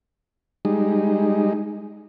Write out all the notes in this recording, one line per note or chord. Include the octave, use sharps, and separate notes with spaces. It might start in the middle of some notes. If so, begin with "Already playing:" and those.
G3 G#3 D#4